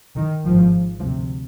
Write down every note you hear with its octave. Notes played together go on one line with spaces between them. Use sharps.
D#3
G#1 G#2 F3
D2 C3 F3